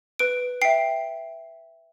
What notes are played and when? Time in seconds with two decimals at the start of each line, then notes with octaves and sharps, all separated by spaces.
0.19 B4 D7
0.62 E5 G5 C7